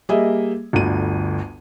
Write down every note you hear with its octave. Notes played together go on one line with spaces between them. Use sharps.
G3 A#3 G#4 D#5 E5
G1 D2 D#7